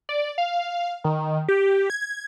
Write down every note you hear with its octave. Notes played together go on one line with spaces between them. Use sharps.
D5
F5
D#3
G4
G#6